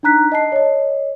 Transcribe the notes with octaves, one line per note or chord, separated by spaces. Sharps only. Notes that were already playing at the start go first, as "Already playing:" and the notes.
D4 D#4 A#5 F#6 B6
D#5 A5 C7
C#5 D#5